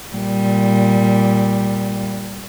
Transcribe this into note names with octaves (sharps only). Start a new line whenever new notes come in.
A#2 G3